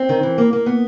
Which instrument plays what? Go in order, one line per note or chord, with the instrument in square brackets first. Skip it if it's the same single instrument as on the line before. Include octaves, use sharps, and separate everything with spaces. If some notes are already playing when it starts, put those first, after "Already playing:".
Already playing: [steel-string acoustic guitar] C4
D#3
E3
A#3
A#3
B3